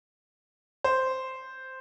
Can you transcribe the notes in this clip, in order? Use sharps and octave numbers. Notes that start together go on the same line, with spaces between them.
C5